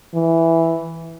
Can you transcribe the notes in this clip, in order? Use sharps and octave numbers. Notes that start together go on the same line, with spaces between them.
E3